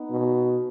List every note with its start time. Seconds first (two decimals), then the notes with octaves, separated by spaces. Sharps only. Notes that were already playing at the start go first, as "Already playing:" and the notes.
Already playing: B3 D#4
0.11 B2